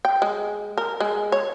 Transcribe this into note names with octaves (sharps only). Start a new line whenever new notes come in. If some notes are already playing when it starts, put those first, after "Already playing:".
G5
G#3
A#4
G#3
C#5